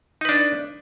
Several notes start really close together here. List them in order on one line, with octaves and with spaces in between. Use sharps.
D#4 B4 D4